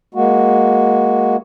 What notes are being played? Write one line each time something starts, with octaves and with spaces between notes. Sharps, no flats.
G#3 A#3 F#4